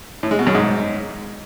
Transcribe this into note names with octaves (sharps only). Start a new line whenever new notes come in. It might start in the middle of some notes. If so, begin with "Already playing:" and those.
A2
G#3
B2
F#2
G#2